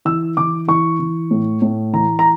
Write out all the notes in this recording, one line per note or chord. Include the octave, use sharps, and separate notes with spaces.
E3 E6
E3 D6
E3 C#6
E3
A2
A2
E3 A#5
A#5